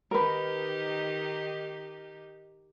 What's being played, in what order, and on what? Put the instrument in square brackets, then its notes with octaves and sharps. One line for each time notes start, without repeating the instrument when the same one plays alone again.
[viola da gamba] D#3 D#4 G4 [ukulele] A#4 B4